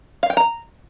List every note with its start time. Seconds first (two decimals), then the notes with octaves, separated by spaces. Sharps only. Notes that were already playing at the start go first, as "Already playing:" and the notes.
0.23 F5
0.30 G5
0.37 A#5